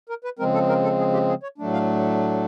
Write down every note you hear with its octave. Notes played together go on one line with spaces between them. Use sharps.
A#4
B4
C#3 F3 G#3 C4 A#4
A4
A#4
A4
G#4
G4
G#4
C#5
A2 F#3 A3 D4
F5